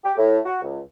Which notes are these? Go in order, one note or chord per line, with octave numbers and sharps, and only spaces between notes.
G4
A2
F#4
C#2